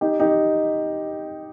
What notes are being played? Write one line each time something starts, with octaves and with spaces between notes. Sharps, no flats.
D#4 G4
D#4 G4